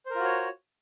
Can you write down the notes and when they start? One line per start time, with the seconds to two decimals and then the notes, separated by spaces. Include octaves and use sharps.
0.06 C5
0.10 A#4
0.15 F4
0.20 F#4
0.24 C#5